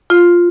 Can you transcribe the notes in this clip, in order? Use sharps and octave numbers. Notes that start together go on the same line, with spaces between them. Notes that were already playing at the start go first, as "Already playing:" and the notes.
F4